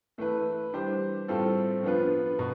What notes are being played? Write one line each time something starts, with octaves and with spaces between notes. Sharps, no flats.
E3 A3 E4 B4
E3 G3 D4 G4 C5
A2 G3 C4 F4 A4
F3 B3 D4 F4 B4
B2